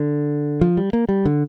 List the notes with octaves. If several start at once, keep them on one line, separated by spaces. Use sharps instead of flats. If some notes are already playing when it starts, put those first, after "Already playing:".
Already playing: D3
F3
G3
A#3
G3
D3